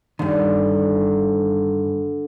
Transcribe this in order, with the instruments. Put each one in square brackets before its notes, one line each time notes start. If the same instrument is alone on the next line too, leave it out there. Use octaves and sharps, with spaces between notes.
[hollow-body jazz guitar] G2 D#3 [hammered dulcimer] D3